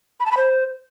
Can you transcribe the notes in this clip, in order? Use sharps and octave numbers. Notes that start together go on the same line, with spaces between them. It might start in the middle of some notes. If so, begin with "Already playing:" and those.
B5
A5
B5
C5